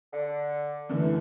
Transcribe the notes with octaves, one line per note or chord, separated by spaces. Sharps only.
D3
F#2 D3 E3 A3